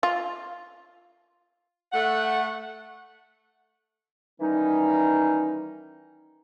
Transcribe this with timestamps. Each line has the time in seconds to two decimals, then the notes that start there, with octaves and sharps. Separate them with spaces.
0.03 F4
1.93 A3 F#5
4.41 D#3 E3 G3 C#4 D#4